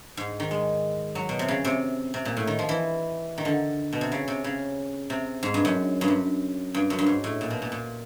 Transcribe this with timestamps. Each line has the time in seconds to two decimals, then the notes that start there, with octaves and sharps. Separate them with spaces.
0.17 G#2
0.40 D#3
0.51 G#3
1.15 F#3
1.29 B2
1.39 C3
1.48 C#3
1.64 C3
2.14 C3
2.25 A#2
2.37 A2
2.47 D#3
2.59 F3
2.69 E3
3.38 D#3
3.45 D3
3.93 B2
4.01 C3
4.12 C#3
4.28 C3
4.44 C#3
5.10 C3
5.43 G#2
5.54 G2
5.65 F#2
6.01 G2
6.08 F#2
6.74 G2
6.90 F#2
6.99 G2
7.06 G#2
7.24 A2
7.41 A#2
7.50 B2
7.62 A#2
7.72 A#2